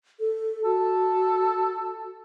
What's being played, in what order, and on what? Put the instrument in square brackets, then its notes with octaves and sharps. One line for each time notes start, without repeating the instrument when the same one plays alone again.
[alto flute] A4
[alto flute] F#4 [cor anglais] A4